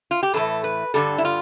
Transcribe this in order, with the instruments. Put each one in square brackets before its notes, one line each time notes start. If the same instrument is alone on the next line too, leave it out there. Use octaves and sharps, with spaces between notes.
[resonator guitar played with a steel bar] F4
G4
A2 E3 A3 A4
B4
G2 D3 G3 A4
E4
F4